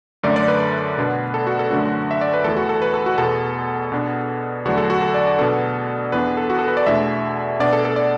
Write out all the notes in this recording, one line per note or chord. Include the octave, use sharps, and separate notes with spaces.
F#2 D3 A3 D4 D5
D5
B4
B2 B3 D4
A4
F#4
A4
F#2 D3 A3 D4 F#4
E5
D5
B4
E2 E3 A3 A4
F#4
A4
B4
A4
F#4
E2 B2 B3 A4
B2 B3 D4
E2 D3 F#3 A3 D4 F#4
A4
F#4
A4
D5
D5
B2 B3 D4 A4
E2 E3 B3 D4 B4
A4
F#4
A4
B4
D5
E2 B2 A3 D4 E5
B2 B3 D4 D5
A4
A4
D5